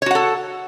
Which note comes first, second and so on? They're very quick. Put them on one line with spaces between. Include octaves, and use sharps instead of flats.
C#5 F#4 F#5 A4